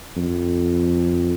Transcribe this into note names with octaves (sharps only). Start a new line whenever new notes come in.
F2